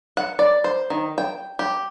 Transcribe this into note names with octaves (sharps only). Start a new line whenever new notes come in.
F#5
D5
C5
D#3
G5
G4